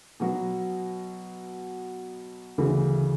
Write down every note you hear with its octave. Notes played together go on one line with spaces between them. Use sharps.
B2 F#3 B3 F#4
D2 C#3 E3